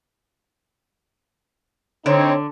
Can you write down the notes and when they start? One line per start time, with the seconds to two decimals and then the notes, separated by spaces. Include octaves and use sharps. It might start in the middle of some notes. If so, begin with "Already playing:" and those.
2.06 D3 C4 D#4 C#5